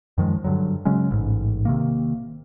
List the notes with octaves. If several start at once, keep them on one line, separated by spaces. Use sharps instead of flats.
F#2 D#3 F3 G#3
G2 D3 F#3
C#3 F#3 G#3 C#4
A1 G#2
C3 D#3 A#3